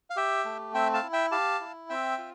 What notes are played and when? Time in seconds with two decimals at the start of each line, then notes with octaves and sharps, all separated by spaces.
0.10 F5
0.16 G4 E5 G5
0.45 A3
0.74 C4 E5 G5
0.93 F5 A5
1.03 E4
1.13 E5 G5
1.31 G4 F5 A5
1.60 E4
1.89 C4 E5 G5
2.18 F4